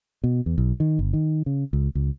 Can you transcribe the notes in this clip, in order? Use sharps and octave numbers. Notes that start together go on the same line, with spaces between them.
B2
E2
B1
D#3
G1
D#3
C#3
C#2
C#2